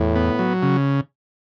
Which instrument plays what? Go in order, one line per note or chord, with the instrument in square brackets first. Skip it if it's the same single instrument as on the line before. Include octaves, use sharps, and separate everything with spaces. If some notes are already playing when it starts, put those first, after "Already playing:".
Already playing: [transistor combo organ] E2 [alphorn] A2
[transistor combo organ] B3
F#3
C#3